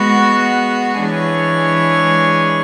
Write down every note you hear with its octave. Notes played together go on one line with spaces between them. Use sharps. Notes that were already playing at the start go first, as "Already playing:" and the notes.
Already playing: G#3 B3 F#4
E3 G#3 D4 G#4 C#5